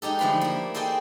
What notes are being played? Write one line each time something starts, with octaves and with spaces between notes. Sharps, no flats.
G#3 D#4 G4 A4
D3 F3 A3 B4 C6
A#3 E4
G#4 A4 C5 D#5 G5